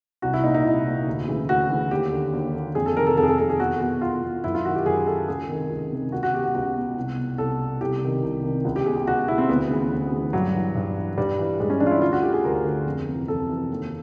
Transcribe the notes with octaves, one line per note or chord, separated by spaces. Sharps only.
C2 F#4
E4
A#2 D#4
D#4
C2 E4
A#2
D2
C#3 E3
D2 F#4
C#3 E3
D#2 G4
D3
D#2
D3
F2 G#4
A4
C3 D#3 A#4
A4
F2 A4
G#4
A4
C3 D#3 A4
G#4
E2 F#4
B2 F#4
E2 F4
B2
F#2 E4
F4
D#3 F#4
G4
F#2 G#4
D#3 A4
C#2 G#4
C3 D#3
C#2
C3 D#3
C#2 F#4
F#4
B2 G4
F#4
C#2 F#4
B2
C2
B2
C2 A4
B2
C2 G4
C3 D#3
C2
C3 D#3
C#2
G4
B2 G#4
G4
C#2 F#4
B2 E4
C4
D2 B3
C#3 E3
D2
C#3 E3
G2 F#3
E3
G2
E3
G2 G3
E3
G2 G#3
C#4
E3 D4
F4
E4
D2 F4
F#4
D3 G4
G#4
D2 A#4
D3
F2
C3 E3
F2 A4
C3 E3
D#2